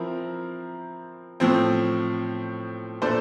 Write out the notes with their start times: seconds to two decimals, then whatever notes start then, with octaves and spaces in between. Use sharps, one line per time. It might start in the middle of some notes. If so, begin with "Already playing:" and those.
Already playing: F3 C4 E4 A#4
1.40 A2 F3 C4
3.02 A#2 A3 D4 A4 C5